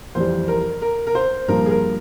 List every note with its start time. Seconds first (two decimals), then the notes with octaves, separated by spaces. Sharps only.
0.15 F2 E3 G3 C5
0.48 A#4
0.82 A#4
1.07 A#4
1.15 C5
1.48 G2 F3 A#3 A#4
1.66 G#4
1.70 A#4